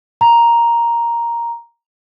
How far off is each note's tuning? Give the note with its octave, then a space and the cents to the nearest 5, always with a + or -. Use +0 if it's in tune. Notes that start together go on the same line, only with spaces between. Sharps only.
A#5 +5